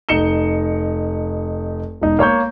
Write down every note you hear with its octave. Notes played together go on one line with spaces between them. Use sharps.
F1 D#4 C#7 E7 G7
E1 D#4
A#3 C#5 C#6 G6